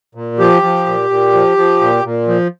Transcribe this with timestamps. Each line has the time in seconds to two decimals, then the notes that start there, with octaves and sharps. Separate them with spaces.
0.15 A#2
0.39 F3 G4
0.62 F3
0.87 A#2
1.10 A#2
1.33 F3
1.57 F3
1.81 A#2
2.04 A#2
2.28 F3